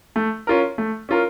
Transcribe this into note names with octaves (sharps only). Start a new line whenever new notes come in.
A3
C#4 F4 A#4
A3
C#4 F4 A#4